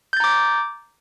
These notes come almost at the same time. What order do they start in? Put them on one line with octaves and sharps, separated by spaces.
G6 A6 A#5 D6